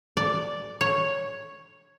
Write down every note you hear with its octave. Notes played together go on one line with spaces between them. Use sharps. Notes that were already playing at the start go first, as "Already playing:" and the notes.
D5
C#5